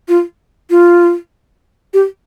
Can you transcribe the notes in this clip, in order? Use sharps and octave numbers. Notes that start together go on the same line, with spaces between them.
F4
F4
G4